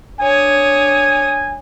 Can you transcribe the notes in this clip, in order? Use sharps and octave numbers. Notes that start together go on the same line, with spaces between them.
D4 C#5 G#5 D#6